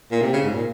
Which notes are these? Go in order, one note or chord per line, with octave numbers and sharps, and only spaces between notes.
A#2
C3
C#3
G#2
A#2